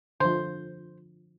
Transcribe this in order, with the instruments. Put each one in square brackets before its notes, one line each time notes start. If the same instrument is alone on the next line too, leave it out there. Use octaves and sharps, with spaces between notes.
[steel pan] D3 F3 [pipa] C5